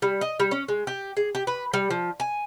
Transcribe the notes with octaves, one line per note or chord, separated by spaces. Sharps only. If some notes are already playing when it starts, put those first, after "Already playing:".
G3
D#5
G3
C#4
G#3
G4
G#4
G4
B4
G3
F3
G#5